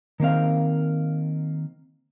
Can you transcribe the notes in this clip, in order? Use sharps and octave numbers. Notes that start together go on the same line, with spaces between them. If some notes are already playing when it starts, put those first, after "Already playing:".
D#3 A#3 C4 F5